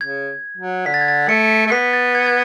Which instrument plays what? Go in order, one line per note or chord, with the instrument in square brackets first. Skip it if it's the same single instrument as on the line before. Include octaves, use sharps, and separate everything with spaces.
[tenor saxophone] C#3 [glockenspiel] G#6
[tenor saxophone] F#3
[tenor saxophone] D3 [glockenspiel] B6
[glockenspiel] A6
G#6
A6
[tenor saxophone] A3 [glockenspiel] C#7
[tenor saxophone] A3
[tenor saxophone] B3 [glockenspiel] B6
[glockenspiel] A6
G#6
G#6